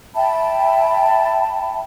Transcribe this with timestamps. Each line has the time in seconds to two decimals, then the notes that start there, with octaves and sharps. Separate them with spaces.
0.16 E5 G5 A5 B5